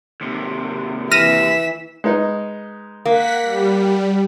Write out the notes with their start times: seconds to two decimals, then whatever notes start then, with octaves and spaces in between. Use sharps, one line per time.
0.21 D#2 C3
1.12 E3 F6 A#6 B6 D#7 E7
2.04 G#3 B3 D#4
3.06 A#3 F#5 B6
3.42 G3